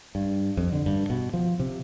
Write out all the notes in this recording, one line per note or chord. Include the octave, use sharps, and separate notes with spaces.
G2
F2
D3
G2
B2
F3
C3